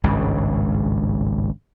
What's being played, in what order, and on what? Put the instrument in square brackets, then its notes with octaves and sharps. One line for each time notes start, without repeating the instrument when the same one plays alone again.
[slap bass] G#1 C#2 G2 C#3